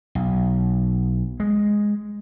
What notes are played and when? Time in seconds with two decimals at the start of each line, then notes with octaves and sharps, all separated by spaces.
0.15 B1
1.40 G#3